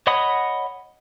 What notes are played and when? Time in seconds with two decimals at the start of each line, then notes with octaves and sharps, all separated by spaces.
0.07 C#5 D#5 F#5 B5 D#6